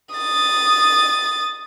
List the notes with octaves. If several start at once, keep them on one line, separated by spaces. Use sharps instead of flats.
D#6 A6